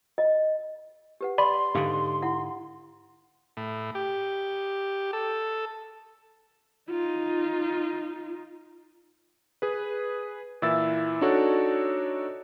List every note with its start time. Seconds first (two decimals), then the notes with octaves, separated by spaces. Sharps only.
0.18 D#5
1.21 G4 B4 F#5
1.38 D5 B5 C6
1.75 G#2 D3 G4 F5 D6
2.22 E4 F#5
3.57 A2
3.95 G4
5.13 A4
6.90 D#4 F4
9.62 G#4 B4
10.62 A#2 E3 E4 E5 E6 A6
11.21 D4 D#4 F#4 A4 C#5 D5